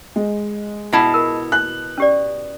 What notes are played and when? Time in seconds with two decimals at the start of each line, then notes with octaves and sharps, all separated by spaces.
0.16 G#3
0.92 B2 E4 F4 F#5 A5
1.14 A#4
1.52 F#6
1.98 C#4 G4 D5